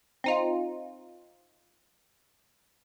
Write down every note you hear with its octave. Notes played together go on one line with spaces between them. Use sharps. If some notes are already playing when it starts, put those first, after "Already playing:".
C4 D#4 F4